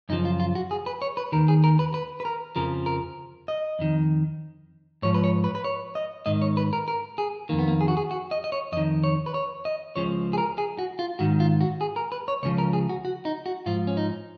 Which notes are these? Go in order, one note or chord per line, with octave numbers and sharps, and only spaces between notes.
F#2 C#3 F3 D#4
F4
F4
F#4
G#4
B4
C#5
B4
D#2 D#3 A#4
G#4
A#4
B4
B4
B4
A#4
F2 C#3 F3 A#4
A#4
D#5
F2 D#3
G#2 F3 C#5
B4
C#5
B4
B4
C#5
D#5
G#2 D#3 D#5
C#5
B4
A#4
A#4
G#4
F2 D#3 A#3
B3
A#3
G#4
F#4
G#4
F#4
D#5
D#5
C#5
F2 D#3 D#5
C#5
B4
C#5
D#5
C#2 C#3 F3 C#5
G#4
A#4
G#4
F#4
F4
G#2 D#3 F#4
F4
F#4
G#4
A#4
B4
C#5
C#2 C#3 F3 C#5
A#4
G#4
F#4
F#4
D#4
F#4
G#2 F3 F4
C#4
D#4